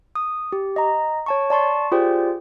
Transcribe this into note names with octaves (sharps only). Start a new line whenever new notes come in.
D#6
G4
D#5 A#5
C#5 A5 C#6
D5 A5 C6 C#6
F4 G4 G#4 C5 D5 G5